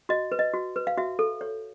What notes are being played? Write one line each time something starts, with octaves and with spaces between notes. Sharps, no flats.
F#4 D#5
B4
D#5
F#4
B4
F5
F#4 E5
A4
C#5